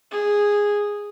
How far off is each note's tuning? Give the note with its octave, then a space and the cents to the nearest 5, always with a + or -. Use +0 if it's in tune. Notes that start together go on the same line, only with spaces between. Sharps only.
G#4 -10